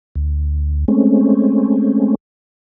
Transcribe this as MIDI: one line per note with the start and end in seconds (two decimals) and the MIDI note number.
0.15 0.85 38
0.88 2.15 56
0.88 2.15 57
0.88 2.15 60
0.88 2.15 61